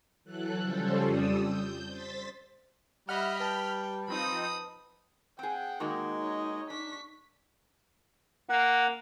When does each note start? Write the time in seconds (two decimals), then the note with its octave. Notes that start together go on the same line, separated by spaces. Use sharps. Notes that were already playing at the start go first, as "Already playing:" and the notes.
0.24 E3 F#3 A4 F#6
0.60 C#3 F3 G3 C#4 A4 C5
1.05 F2 G3 D5 D#6 E6
1.40 G6
1.88 C5 A6 B6
3.09 G3 D#5 E5 F#5 B5 F6
3.40 B4 G5 A5
4.08 F3 C4 D#4 B5 D#6
5.39 C4 G#4 F#5 G5
5.80 D#3 G#3 A#3 D#4 F#4
6.21 C#5 D#5
6.70 D4 C#6 B6
8.49 A#3 F#5